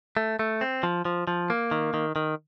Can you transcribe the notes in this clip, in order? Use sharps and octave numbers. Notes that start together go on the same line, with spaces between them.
A3
A3
C4
F3
F3
F3
A#3
D#3
D#3
D#3